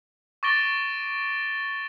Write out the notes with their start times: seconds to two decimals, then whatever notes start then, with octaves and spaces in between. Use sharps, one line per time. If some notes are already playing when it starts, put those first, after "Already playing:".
0.43 C#6 D6 A6 A#6 D7 G7